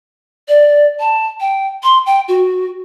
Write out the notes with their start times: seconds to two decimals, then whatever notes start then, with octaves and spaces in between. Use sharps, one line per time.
0.48 D5
1.00 A5
1.40 G5
1.83 C6
2.06 G5
2.28 F#4